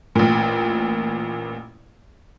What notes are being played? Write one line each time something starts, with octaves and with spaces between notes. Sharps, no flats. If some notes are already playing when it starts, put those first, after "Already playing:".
A1 A#2